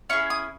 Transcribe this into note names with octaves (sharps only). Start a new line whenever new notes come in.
C#4 E4 G#4 C#6
D#6